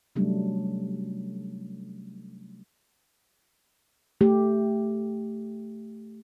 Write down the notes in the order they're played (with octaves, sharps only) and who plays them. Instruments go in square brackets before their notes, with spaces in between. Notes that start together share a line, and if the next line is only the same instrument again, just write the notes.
[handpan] C3 F#3 G3 A3 C#4 D4
A3 G4